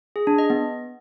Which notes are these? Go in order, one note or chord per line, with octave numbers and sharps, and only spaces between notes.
G#4
D4
D#5
B3